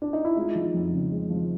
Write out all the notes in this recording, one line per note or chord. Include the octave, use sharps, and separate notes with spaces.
D4
D#4
E4
G#3 D#4 F4
F3
F2
C#3
G#3
F3